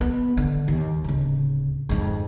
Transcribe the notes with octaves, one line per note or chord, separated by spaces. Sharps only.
B3
D3
D#2
D1 C#3
F2 G#2